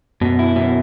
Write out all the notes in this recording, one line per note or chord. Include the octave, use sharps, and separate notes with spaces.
F#2 B2
E4
B2